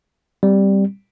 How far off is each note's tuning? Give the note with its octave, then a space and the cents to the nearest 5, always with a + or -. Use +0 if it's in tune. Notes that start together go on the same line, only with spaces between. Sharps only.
G3 +0 C4 +0